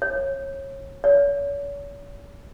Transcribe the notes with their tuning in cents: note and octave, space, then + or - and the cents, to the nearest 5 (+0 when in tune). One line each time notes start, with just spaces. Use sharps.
C#5 -20
C#5 +40